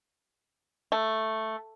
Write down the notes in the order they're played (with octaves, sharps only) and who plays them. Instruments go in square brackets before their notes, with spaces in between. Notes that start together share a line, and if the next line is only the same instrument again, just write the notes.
[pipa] A3